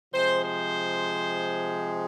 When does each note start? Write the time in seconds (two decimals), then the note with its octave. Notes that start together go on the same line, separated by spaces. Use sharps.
0.13 C3 F3 G#3 C5
0.43 C5